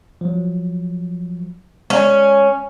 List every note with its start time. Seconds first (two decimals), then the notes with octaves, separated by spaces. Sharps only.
0.21 F3 F#3
1.90 G#3 C#4